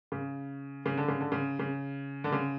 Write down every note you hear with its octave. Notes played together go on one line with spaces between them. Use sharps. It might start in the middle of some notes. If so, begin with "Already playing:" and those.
C#3
C#3
D3
C#3
D3
C#3
C#3
D3
C#3